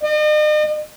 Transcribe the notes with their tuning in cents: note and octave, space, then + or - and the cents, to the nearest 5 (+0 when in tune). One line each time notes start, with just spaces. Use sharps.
D#5 -40